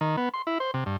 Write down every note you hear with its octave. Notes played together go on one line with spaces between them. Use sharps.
D#3
B3
C6
E4
C5
C3
G2